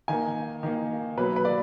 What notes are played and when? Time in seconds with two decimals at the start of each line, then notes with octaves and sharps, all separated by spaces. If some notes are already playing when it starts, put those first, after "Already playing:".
0.08 D#3 A#3 G#5
0.63 D#3 A#3
1.18 B2 F#3 A#3 B4
1.36 B4
1.45 D5